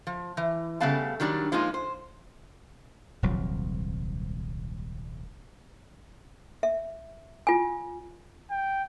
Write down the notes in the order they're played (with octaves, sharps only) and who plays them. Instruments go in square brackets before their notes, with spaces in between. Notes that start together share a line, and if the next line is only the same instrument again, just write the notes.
[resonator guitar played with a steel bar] F3
E3
C#3 G3 A3 B3 F5 A5
D#3 F#3 G3 D4
F3 G#3 A#3 D#4 F4
C5
[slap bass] D#1 C2 F3 F#3
[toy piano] E5
F4 G#5
[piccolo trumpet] G5